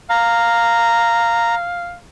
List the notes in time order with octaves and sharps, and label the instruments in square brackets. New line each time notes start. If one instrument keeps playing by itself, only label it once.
[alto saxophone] F5 [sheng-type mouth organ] A#5